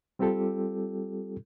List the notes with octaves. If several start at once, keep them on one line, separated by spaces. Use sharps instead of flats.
G3 C4 F4 G4 A4